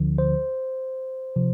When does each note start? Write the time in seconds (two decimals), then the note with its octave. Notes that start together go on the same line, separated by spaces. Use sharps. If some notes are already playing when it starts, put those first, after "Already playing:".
Already playing: D2 D3 F3
0.18 C5
1.36 C3 F3